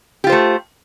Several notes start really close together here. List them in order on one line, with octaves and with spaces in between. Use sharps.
G4 F4 C5 A3